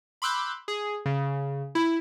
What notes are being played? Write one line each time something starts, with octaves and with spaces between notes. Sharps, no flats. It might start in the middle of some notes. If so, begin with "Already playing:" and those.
B5 C6 D6 E6 F#6 G6
G#4
C#3
E4